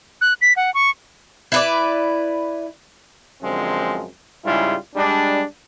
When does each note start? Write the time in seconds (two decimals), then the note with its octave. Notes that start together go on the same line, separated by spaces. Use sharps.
0.21 F#6
0.41 B6
0.56 F#5
0.74 C#6
1.52 E4 B4 D5
3.42 F#2 D3 F3 G#3 C4
4.45 G#2 C#3 G3 E4 F4
4.96 G3 G#3 D4